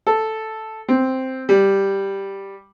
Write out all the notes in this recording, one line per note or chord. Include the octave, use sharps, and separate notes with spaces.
A4
C4
G3